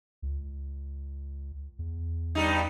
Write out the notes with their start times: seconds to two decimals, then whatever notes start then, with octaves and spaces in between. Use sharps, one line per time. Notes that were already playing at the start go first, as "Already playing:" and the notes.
0.22 C#2
1.79 E2
2.35 G2 G3 D#4